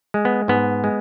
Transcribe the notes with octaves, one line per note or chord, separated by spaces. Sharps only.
G#3
B3
G#2 B3
G#3